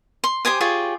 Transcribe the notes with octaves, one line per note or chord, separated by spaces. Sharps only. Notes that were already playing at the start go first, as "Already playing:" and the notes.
C6
G4 C5 G#5 D#6
F4 G4 G#4 C#5